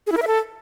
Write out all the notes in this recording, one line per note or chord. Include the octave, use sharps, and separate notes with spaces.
G#4
E4
A#4
E5
A4